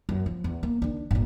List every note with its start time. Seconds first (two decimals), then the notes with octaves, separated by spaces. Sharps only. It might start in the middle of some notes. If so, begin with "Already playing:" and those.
0.09 F#2
0.26 F3
0.44 E2
0.63 A#3
0.82 D#3 D4
1.11 G1 A#2